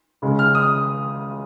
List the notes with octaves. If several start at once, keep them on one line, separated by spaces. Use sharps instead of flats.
C#2 C#3 G#3
F6
D#6